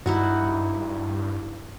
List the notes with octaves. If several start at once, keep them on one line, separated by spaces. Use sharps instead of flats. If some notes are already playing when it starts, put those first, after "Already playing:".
G2 D#4 E4 F#4